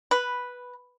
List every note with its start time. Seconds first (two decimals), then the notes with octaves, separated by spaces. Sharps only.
0.11 B4